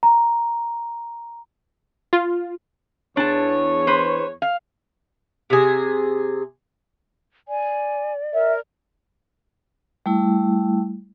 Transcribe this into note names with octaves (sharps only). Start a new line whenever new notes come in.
A#5
F4
E2 D4 C#5 A5
B4 C5
F5
C3 G#4
D5 G#5
A#4 E5
G3 A3 E4